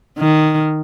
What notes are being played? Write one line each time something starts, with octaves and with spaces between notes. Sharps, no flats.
D#3